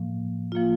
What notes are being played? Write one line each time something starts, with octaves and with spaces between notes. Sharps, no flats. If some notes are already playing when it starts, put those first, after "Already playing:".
Already playing: A2 F3 A#3
F3 A#3 F4